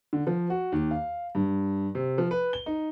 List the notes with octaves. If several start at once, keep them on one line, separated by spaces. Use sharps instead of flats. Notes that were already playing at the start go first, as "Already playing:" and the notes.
D3
F3
F#4
D#2
F5
G2
C3
F3
B4
G7
D#4